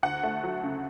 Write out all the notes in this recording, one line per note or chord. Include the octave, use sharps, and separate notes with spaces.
D2 F#5
A3
F#3
C#3